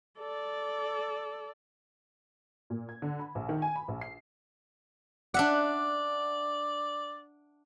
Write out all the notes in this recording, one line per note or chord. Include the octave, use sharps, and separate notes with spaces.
A4 D5
A#2
G#6
D3
B5
A#1
D#3
G#5
B5
A#1
C7
D4 D5 E5 F#5